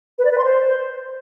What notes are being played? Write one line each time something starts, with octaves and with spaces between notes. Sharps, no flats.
B4
D5
B4
C6
C5